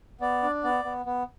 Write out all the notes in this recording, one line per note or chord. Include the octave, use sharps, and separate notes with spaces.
B3 D5
D4
B3 D5
B3
B3